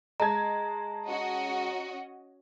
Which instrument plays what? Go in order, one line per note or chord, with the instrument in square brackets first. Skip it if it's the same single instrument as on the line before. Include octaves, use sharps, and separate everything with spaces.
[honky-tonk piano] G#3 A5 G#6 [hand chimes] A#5
[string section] C#4 F#4 D#5